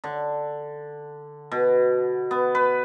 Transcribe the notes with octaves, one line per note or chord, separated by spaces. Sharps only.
D3
B2
B3
B4